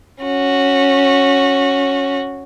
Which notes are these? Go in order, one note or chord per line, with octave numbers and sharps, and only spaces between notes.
C#4 F#4